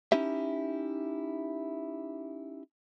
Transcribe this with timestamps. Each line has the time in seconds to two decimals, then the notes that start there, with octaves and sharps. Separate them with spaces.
0.12 C#4 D#4 E4 G4 E5